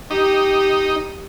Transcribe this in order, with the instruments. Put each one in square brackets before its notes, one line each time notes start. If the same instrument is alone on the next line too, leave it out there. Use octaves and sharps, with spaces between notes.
[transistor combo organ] D#4 [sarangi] G4